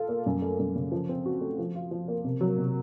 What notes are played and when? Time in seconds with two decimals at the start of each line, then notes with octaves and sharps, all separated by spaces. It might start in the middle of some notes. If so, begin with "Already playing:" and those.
Already playing: F4 A4
0.08 A#3
0.26 F#2
0.42 A3
0.59 F#2
0.76 C#3
0.92 F3
1.09 C4
1.26 F#4
1.41 A3
1.59 F3
1.75 F4
1.91 F3
2.08 A#3
2.25 C3
2.41 F#3
2.58 C3